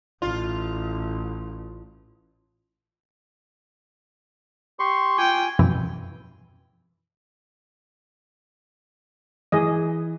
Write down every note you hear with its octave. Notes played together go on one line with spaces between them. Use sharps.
A1 F4
G4 C6 C#6
F4 G5 G#5
F#2 B2 E3 F3
E3 G#4 D#5